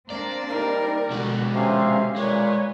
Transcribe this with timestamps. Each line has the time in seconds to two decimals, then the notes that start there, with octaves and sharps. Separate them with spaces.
0.10 A#3 C4 D4 D5
0.50 G3 D#4 A#4
1.11 B2 D3 G#3 F#4 D5
1.55 C3 C#4 F5
2.16 A#2 G#3 B4 C#5